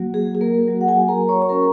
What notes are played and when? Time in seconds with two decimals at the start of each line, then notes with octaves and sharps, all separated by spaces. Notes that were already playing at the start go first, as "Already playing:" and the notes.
Already playing: F#3 A#3 F#4
0.14 G#4
0.35 G#4
0.41 A#3 A#4
0.68 F#3 A#3 F#4
0.81 F#5
0.88 G#4 G#5
1.08 A#4 A#5
1.29 C#5 C#6
1.42 C#6
1.49 F#3 C#4 F#4 A#4 A#5